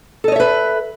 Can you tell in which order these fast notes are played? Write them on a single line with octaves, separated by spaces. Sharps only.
A4 D#5 C#5 E5 B4